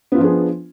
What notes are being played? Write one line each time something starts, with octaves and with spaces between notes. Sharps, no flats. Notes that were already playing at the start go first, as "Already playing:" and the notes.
F3 B3 D4 F4 G#4